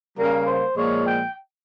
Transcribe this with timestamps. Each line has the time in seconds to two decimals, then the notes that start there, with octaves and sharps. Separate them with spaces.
0.17 C#3 G3 A#3 A#4
0.46 C5
0.76 A#2 F3 G#3 C#5
1.06 G5